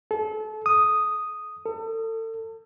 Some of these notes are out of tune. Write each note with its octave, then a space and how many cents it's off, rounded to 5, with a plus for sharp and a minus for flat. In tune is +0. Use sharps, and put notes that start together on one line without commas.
A4 -30
D#6 +0
A4 +35